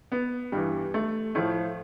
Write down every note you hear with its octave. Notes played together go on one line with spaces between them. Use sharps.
B3
G2 E3 G3
A3
A2 F3 A3